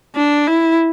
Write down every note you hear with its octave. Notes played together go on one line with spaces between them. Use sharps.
D4
E4